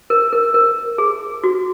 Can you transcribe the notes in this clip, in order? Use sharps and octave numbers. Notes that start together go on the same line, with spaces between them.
A#4
A#4
A#4
G#4
F#4